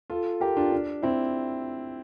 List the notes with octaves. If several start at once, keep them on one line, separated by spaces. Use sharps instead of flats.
F4 A4
G4 A#4
D4 F4
D4
C4 E4